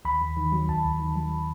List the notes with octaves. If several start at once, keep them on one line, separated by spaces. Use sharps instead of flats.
D#2 B5
D#2
D#3
F#3
D#2 A5
D#2
D#3
F#3